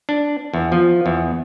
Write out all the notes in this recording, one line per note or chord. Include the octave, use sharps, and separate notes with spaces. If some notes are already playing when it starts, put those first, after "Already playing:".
D4
E2
F3
E2